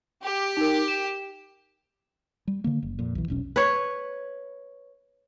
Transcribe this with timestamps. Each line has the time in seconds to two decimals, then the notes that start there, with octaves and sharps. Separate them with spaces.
0.23 G4
0.57 D#4 A#4
0.88 E7
2.47 G3
2.64 D3 D#3 A#3
2.83 F#1
2.99 F2 A#2
3.15 B1 E3
3.28 E1 B1 C#4
3.56 B4 C#5